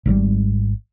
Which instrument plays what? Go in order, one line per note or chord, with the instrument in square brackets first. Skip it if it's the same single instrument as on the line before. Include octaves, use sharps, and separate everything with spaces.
[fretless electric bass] G#1 G#2 C#3 G3